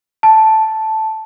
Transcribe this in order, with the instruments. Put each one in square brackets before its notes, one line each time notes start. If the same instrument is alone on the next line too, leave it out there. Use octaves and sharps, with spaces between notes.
[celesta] A5